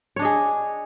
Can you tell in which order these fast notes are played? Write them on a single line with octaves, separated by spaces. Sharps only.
C#5 D4 D#5 G#4